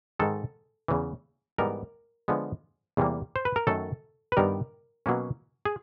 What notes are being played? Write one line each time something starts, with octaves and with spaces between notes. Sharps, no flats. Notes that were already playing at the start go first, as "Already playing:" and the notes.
G#2 D#3 G#3 A4
E2 C#3 E3
G#2 E3 G3 B3 A#4
D3 F3 G#3 B3
E2 C3 E3 G3 A#3
C5
B4
A#4
F#2 D#3 F#3 A3 A4
B4
G2 D#3 G3 B3 A#4
B2 F#3 A#3 C#4
G#4